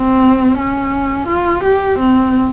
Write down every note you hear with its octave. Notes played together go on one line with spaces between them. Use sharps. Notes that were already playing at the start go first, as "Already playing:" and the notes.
Already playing: C4
C#4
F4
G4
C4